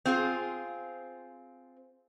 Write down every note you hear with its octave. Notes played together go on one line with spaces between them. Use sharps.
C4 F4 G#4